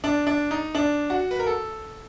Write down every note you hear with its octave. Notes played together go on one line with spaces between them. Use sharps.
D4
D4
D#4
D4
F#4
B4
A#4
A4